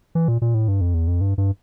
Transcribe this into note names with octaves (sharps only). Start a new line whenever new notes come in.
E3
A#2
A#2
A2
G2
F2
E2
F2
G2
G2